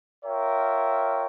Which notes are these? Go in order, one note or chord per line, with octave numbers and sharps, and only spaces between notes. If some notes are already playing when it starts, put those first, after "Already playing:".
F4 A#4 C#5 E5 G5